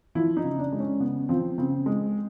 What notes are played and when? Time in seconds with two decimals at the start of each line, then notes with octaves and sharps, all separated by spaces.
0.15 F3 E4
0.37 D#4
0.44 C#3
0.59 D4
0.72 G#3
0.80 C#4
1.00 C#3 B3
1.29 F3 C4
1.58 C#3 C4
1.86 G#3